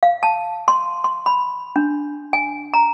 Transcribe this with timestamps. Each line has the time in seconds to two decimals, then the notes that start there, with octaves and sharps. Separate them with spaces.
0.03 F5
0.23 A5
0.68 C6
1.04 C6
1.26 B5
1.76 D4
2.33 G#5
2.74 A#5